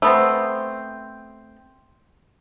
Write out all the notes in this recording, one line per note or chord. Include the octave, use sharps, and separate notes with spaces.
A3 B3 C4